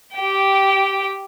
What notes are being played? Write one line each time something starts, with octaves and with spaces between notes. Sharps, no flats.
G4 G5